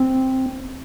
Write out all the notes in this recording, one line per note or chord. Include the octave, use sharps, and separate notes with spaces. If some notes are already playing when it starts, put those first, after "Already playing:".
Already playing: C4